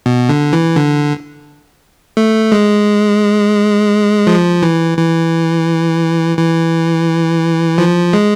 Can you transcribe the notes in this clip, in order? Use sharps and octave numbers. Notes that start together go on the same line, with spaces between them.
B2
D3
E3
D3
A3
G#3
F3
E3
E3
E3
F3
G#3